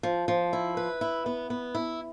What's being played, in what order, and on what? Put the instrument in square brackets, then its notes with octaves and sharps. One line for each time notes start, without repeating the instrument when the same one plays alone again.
[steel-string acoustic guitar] F3
F3
E4
B4
E4
B3
B3
E4